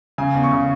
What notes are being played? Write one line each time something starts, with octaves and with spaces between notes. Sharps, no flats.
C#3 G#5
E2
C#6
C#3